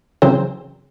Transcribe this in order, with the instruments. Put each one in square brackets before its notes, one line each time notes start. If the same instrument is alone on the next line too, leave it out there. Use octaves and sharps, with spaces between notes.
[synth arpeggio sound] C#3 E3 F#3 C4 C5